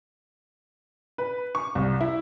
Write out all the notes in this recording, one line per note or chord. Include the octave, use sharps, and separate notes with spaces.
B4
C#6
C2
E4